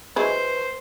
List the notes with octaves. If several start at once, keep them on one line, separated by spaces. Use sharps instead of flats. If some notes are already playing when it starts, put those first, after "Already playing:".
F#3 G#3 E4 B4 C5